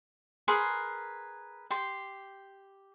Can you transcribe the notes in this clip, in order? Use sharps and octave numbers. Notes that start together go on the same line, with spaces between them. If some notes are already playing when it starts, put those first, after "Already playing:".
G#4 A#4 B4 C6
G4 C6